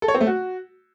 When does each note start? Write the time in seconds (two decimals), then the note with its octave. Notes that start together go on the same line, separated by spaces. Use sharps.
0.02 A4
0.08 C#5
0.14 C4
0.21 A3
0.27 F#4